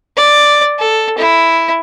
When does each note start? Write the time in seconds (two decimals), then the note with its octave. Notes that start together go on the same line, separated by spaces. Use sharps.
0.17 D5
0.79 A4
1.18 E4